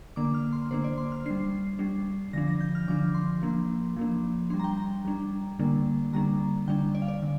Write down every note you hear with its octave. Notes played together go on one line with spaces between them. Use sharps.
D3 A#3 D4 D6
F6
C6
D3 A#3 D4 C5
D5
C6
F6
G3 D4 C7
G3 D4
D3 F3 D4 A#6
A#6
G6
F6
D3 F3 D4 D6
C6
F3 A#3 D4
F3 A#3 D4
G3 D4 C6
A#5
G5
A#5
G3 D4
D3 G3 A#3 D4
D3 G3 A#3 D4 A#5
D3 G3 D4 G5
D5
F5
D5
D3